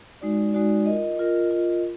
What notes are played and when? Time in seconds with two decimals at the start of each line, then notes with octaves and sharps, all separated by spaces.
0.21 G#3 D#4 F#4 D5
0.53 G#3 D#4 F#4 D5
0.86 F4 A#4 D#5
1.19 F4 A#4 D#5
1.51 F4 A#4 D#5